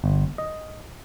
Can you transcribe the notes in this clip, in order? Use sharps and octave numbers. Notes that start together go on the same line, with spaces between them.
G1
D#5